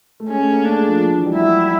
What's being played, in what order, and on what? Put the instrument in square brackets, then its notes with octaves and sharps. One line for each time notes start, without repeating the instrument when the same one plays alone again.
[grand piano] A3
[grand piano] G#3 [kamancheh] C#4
[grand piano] A3
A#3
[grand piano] A3 [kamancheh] D4
[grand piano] G#3
F3
F3
E3
G3
[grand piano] F#3 [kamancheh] E4